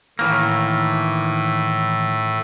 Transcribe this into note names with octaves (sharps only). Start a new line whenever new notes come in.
A2 D#3 E3 A#3